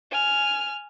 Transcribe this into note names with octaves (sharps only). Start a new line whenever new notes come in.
G#5 F6